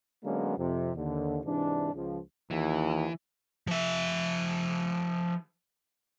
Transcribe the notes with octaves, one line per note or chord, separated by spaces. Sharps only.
D3 F#3 G#3 A#3 B3 C#4
F2 C3
D#2 D3
G#2 C3 E3 D4
C#2 F3
D#2 E3
F3 E5